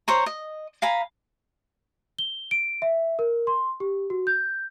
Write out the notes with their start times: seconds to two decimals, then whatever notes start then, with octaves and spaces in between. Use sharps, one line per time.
0.08 C5 C#5 A#5
0.26 D#5
0.82 F5 G#5 A#5 B5
2.19 G7
2.51 D7
2.82 E5
3.19 A#4
3.47 C6
3.80 G4
4.10 F#4
4.27 G6